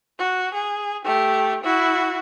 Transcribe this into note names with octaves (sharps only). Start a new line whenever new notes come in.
F#4
G#4
A3 G4
E4 F#4